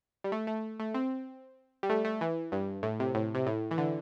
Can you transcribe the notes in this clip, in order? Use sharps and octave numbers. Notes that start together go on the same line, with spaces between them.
G3
A3
A3
A3
C4
G3
A3
A3
E3
G2
A2
C3
A2
C3
A2
E3
D3